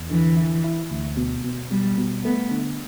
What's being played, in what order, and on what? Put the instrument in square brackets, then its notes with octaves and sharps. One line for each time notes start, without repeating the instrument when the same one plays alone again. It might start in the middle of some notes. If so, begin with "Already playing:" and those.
Already playing: [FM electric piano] E2
[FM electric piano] D3 [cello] E3
[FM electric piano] E4
E4
D2
B2
B2
[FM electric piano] B2 [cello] G3
[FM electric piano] B2
[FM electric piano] A3 [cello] B3
[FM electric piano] D3